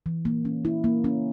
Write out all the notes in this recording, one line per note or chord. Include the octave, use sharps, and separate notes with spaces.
E3
A#3
C#4
E4
A#3
C#4